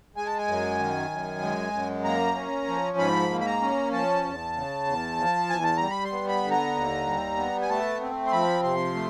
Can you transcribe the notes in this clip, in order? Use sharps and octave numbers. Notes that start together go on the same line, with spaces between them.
G#3 G#5
A5
G#5
F#2
D#3
F#2
G#3
F#2
A#3 A#5
C#4
F3
G#2 B5
A#3
B5
A#5
C#4
F3 A5
E2
C#3
E2
F3
E2 G#5
A5
G3 A#5
B5
C6
B3
B5
D3
A#5
D#2
G3
B3
G#5
A3 A5
C4
C6
F3 B5
C3 C6
A3